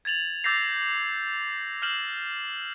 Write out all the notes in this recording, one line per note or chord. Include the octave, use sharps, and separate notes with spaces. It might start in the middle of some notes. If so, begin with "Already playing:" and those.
G#6 A6 F7 F#7
D6 E6 G6 A6 A#6 C7
F6 G6 C7 E7 F#7